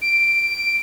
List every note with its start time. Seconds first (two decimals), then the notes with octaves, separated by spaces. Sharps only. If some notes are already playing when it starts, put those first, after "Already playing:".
0.01 D7